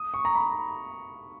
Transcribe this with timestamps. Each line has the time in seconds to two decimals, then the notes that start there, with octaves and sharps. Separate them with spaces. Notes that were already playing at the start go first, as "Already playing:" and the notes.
Already playing: D#6
0.14 C#6
0.25 A#5
0.36 B5